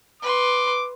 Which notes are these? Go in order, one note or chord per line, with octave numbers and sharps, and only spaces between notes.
B4 C6 D6